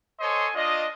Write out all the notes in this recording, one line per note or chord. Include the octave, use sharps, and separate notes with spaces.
A4 C5 C#5 D#5 G#5 C6
D4 F4 D5 D#5